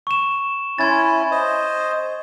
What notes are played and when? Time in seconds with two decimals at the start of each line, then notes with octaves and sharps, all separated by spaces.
0.07 C#6 E7
0.78 C#4 E4 C6 G#6 A6
1.32 C5 D#5